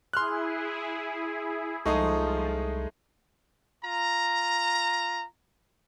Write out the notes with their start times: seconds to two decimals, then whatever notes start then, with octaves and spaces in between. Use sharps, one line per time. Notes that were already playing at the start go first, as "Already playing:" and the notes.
0.13 E4 G#4 C6 F6 F#6
1.85 C2 F3 G#3 A3 D#4 G#4 D#6
3.85 F4 A#5